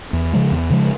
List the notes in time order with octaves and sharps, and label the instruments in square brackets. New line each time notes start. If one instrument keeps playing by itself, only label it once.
[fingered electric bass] E2
C#3 F3 G#3
E2
C#3 F3 G#3